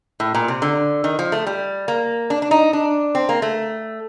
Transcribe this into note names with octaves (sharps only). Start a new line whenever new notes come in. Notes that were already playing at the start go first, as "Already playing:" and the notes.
A2
A#2
C3
D3
D#3
F3
A3
G3
A#3
D4
D4
D#4
D4
C4
A#3
A3